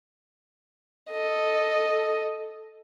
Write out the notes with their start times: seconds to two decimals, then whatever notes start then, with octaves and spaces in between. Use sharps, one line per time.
1.11 A4 D#5